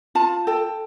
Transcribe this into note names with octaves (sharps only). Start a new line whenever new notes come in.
F4 A5
A4 G5